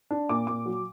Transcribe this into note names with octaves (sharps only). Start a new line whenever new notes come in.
D4
A#2 D6
A#2 D6
F#3